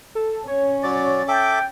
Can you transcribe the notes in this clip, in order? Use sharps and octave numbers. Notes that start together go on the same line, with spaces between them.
A4
C#4 C#5
F#3 D5 A6
A4 E5 G5 D6